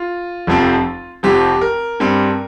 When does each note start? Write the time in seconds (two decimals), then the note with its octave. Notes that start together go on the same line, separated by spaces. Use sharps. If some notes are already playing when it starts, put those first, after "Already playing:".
Already playing: F4
0.47 F1 F2 F3 C4
1.23 F1 F2 F3 C4 G4
1.61 A#4
2.00 G2 G3 C4